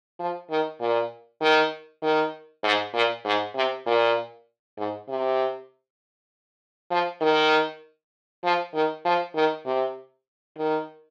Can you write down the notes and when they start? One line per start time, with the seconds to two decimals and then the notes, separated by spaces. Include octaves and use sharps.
0.20 F3
0.50 D#3
0.80 A#2
1.41 D#3
2.03 D#3
2.64 G#2
2.94 A#2
3.25 G#2
3.55 C3
3.86 A#2
4.78 G#2
5.09 C3
6.91 F3
7.21 D#3
8.44 F3
8.74 D#3
9.05 F3
9.35 D#3
9.66 C3
10.58 D#3